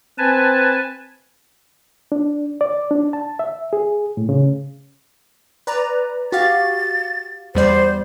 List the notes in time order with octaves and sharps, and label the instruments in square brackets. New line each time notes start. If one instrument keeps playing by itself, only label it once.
[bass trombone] C4 [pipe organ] B4 G#5 A5
[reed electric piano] D4
D5
D4
A5
E5
G#4
A2
C#3
[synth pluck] B4 D5 A#5
[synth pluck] F#4 G4 F5 [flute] A6
[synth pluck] E2 G3 D5 [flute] C5